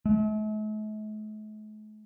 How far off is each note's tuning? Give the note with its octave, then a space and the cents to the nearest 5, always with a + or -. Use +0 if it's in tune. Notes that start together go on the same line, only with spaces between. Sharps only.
A3 -45